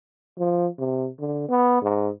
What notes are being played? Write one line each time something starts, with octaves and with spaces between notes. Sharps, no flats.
F3
C3
D3
B3
G#2